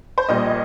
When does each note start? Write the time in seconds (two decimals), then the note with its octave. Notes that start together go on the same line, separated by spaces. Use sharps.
0.18 C5
0.29 A#1 A#2 G3 D#5